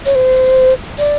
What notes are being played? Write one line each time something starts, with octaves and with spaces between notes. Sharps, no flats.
C#5
C5
D5